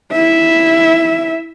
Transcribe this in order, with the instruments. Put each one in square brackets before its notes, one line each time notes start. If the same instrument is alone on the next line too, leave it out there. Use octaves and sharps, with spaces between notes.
[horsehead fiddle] E4 E5